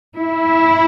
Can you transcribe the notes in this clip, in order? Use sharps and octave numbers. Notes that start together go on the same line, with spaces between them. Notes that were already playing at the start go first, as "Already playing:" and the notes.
E4